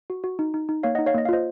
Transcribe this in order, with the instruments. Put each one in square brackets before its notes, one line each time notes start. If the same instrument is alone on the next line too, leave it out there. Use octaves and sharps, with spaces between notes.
[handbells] F#4
F#4
D#4
D#4
D#4
A#3 C#5 F5
D#4 D#5 F#5
C#5 F5
A#3 D#5
F5
F4 C5 D#5